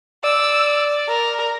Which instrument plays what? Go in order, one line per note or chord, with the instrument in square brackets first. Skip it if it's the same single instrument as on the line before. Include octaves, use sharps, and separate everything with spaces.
[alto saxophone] D5 [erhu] E6
[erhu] A#4